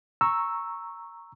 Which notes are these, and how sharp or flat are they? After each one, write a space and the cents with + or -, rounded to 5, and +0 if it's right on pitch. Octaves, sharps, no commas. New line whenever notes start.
A#5 -5 C#6 -5 E6 +0